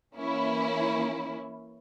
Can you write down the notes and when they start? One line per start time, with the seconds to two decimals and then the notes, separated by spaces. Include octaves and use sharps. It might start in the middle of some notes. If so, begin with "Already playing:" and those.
0.15 E3 A#3 C#4 E4